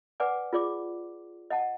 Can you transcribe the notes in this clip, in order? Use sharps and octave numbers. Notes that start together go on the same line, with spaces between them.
B4 D5 F#5 G#5 D6
F4 G#4 D5 D6
D#5 F#5 A5